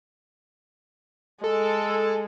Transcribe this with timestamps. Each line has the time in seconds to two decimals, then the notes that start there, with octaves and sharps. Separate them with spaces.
1.44 G#3 A4